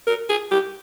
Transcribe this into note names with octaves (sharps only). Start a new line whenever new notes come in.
A#4
G#4
G4